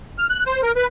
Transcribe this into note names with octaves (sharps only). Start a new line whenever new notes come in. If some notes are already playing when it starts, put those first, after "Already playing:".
F6
F#6
C5
A#4
B4